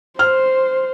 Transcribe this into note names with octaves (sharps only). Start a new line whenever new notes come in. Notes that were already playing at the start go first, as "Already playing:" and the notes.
C5 F6